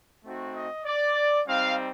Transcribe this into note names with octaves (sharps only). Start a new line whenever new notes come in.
A3 C4 D#4 F#4
D#5
D5
G3 C4 D#4 F5